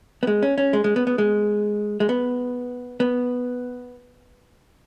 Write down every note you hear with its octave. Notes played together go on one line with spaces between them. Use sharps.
B3
G#3
C#4
C#4
G#3
G#3
B3
B3
G#3
G#3
B3
B3